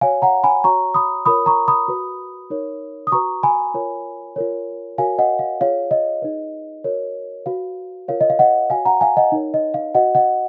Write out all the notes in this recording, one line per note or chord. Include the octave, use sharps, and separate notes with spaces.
F#4 C#5 F5 G#5
F#5 A#5
G#5 B5
F#4 C#5 A#5 C#6
B5 D#6
F4 A#4 C#5 B5 D#6
A#5 C#6
B5 D#6
F#4 B4
D#4 A#4 C#5
D#6
F#4 B4 A#5 C#6
G#5 B5
F4 A#4 C#5
F4 A#4 C#5
F#4 A#4 C#5 F5 G#5
D#5 F#5
F5
F4 G#4 C#5 F5
D#5
D#4 G#4 B4
F#4 A#4 C#5
F#4 B4 F5
F4 A#4 C#5 F5
D#5
F5
D#5 F#5
F#4 C#5 F5 G#5
F#5 A#5
F5 G#5
D#5 F#5
D#4 A#4 C#5
D#5
F5
F#4 B4 D#5 F#5
D#5 F#5